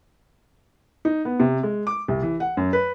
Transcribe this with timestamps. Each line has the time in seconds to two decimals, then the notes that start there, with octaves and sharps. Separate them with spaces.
1.05 D#4
1.25 B3
1.40 C3
1.63 G#3
1.87 D6
2.08 C2
2.22 E3
2.40 F#5
2.57 F#2
2.73 B4